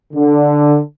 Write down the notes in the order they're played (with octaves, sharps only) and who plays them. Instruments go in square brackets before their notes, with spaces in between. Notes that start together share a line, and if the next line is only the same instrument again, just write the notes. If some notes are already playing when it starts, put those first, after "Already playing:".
[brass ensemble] D3